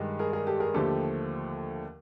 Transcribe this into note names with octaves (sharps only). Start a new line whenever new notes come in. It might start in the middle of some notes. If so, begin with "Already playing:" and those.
Already playing: G2 D#3 G#3
G#4 A#4
G#4 A#4
G4 A4
G#4 A#4
D#2 D3 F3 A3 G4 A4